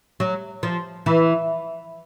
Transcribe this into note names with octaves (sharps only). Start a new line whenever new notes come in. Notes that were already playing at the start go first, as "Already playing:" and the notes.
F#3
F3
E3